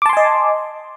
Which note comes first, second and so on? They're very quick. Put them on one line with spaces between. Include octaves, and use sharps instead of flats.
D6 A5 C6 G#5 D#5